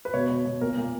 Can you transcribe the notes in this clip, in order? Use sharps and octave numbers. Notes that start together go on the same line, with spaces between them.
B4
B2 C#5
B2
B2
A#2 A#4
A#2